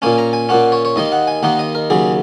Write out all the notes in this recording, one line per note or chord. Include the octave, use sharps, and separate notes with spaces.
A#2 A#3 C#4 G#5
A#5
G#5
A#2 A#3 C#4 F#5
C#5
C#5
D#2 D#3 A#3 D#4 D#5
F#5
G#5
D#2 D#3 A#3 D#4 F#5
D#5
A#4
D#2 C#3 F#3 G#4